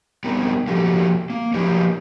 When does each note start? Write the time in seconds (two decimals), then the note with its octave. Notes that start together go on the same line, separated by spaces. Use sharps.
0.24 G3 B3 C4 D#4 A#4
0.67 F3 A#3 F#4 G4 A4
1.30 A#3
1.54 F3 F#3 A#3 D#4 G4 B4